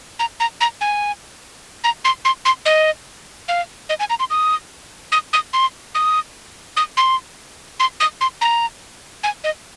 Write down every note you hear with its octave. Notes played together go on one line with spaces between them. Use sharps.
A#5
A#5
A#5
G#5
A#5
C6
C6
C6
D#5
F5
D#5
G#5
A#5
C6
D#6
D#6
D#6
C6
D#6
D#6
C6
C6
D#6
C6
A#5
G#5
D#5